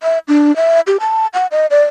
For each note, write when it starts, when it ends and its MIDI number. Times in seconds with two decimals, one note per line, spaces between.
0.03 0.18 76
0.28 0.55 62
0.56 0.80 76
0.87 0.97 67
1.00 1.27 81
1.34 1.47 78
1.51 1.66 75
1.71 1.84 74